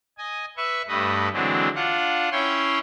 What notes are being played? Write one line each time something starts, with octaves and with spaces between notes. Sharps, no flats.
D#5 G#5
B4 E5 C#6
G2 A3 B4 D#5
D3 E3 F#3 G#3 C4 D4
D4 F4 F#5
C#4 E4 C#5 G5 C6